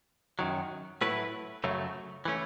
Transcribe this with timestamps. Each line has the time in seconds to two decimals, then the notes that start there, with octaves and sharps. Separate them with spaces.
0.39 F#2 D#3 F#3
1.01 A2 F#3 A3 E4 B4
1.64 F#2 C#3 F#3 A3
2.25 E3 A3 C#4